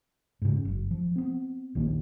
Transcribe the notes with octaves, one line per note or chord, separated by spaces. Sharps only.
G#2 C#3
F#1
F3
B3 C4
A#1 D#2 D#3 A#3